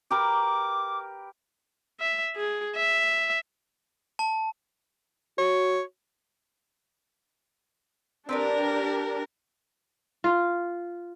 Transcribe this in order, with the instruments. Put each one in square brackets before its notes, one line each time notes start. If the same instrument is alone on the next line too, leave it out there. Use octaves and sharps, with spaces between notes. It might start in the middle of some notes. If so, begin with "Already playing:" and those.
[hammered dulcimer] G4 A#4 B4 [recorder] D6
[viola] E5
G#4
E5
[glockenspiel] A5
[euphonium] F#4 [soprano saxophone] C#5
[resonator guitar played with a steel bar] C4 B4 D5 [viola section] D4 G4 A#4
[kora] F4